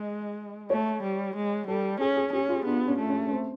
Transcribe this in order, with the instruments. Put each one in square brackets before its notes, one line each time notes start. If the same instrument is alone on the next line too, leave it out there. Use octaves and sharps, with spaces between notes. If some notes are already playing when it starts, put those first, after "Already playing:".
Already playing: [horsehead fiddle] G#3 [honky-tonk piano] D#5
[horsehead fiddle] A3 [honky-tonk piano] C#5
[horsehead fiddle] G3
G#3
[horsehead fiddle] G3 [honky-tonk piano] A4
[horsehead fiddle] C#4 [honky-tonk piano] G#4
[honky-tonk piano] G#4
[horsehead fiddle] C#4 [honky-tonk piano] G4
[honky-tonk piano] F4
[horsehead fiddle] B3 [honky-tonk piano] D4
[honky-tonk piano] C#4
[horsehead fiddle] A3
[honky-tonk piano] C#4
C#4
C4